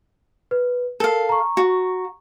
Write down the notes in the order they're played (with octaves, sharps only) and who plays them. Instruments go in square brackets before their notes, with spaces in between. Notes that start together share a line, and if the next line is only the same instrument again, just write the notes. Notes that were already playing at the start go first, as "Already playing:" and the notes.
[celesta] B4
[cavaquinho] A4 F5 [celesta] A#4
[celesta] A#5 C#6
[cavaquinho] F#4